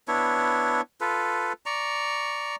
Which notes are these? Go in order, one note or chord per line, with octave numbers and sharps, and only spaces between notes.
B3 D4 E4 C#5
F4 A4 B4
D5 A#5 C#6